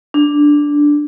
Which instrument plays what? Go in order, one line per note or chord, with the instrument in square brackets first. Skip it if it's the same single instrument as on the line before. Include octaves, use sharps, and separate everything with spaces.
[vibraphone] D4